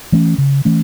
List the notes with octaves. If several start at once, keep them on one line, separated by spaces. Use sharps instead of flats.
E3 A3 C#4
C#3
E3 A3 C#4